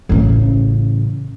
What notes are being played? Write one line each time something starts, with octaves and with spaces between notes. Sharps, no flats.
A1 C#3